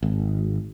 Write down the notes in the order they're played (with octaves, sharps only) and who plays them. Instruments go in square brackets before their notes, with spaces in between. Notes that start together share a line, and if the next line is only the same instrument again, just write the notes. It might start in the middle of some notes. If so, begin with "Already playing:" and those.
[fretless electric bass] G#1